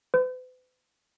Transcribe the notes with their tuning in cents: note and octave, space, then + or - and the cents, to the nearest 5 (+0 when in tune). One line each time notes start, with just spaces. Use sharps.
B4 +45